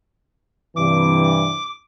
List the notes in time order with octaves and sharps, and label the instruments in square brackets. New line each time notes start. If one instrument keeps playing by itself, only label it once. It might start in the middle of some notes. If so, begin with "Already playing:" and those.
[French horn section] G2 C3 E3 [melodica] D6